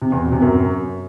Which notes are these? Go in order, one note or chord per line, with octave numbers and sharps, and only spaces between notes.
C3
E2
B2
C3
F#2